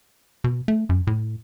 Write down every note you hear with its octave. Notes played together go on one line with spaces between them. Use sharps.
B2
A3
F#2
A2